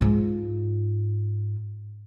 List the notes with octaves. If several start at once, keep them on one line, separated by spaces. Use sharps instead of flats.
G#2 F4